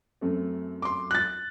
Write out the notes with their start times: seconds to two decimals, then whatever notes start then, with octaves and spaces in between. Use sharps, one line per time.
0.21 F#2 A3 C4
0.82 C6 D6
1.11 F#6 A6